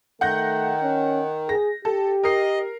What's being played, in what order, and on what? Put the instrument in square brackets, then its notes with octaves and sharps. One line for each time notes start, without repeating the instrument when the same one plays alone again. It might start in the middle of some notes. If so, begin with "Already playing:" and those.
[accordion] D#3 [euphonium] A3 [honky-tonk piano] F#5 G6 A#6
[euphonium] C#4
[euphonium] G#4 [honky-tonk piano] A#6
[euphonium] G4 [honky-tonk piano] A4
[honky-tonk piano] A#4 C7 [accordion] D#5